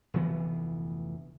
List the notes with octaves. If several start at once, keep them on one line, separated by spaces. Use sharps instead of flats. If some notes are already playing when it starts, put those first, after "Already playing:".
F1 D2 E3 B3